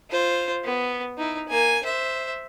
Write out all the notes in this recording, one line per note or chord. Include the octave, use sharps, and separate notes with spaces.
F4 C5
B3
D#4 E4
A#3 G#5
C5 E5